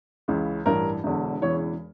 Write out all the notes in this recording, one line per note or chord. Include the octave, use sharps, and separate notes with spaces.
C#2 C#3 E3
A1 G2 E3 A#4
E1 E2 D3
E1 E2 C#3 E3 C#5